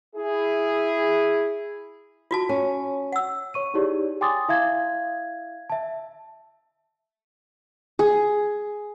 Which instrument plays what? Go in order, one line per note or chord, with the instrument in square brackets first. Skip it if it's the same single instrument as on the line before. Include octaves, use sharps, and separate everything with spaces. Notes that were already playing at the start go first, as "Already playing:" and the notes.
[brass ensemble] E4 G#4
[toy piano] F4 F#4 A5
[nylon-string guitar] C#4
[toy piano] F#5 E6
[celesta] C#5 C#6 D#7
D#4 E4 G4 G#4 C#5 D5
G5 G#5 C6 D6 D#6 A6
E4 E5 F5 G#6
E5 A5
[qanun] G#4